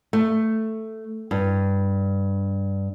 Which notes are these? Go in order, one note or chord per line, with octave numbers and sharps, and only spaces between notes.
A3
G2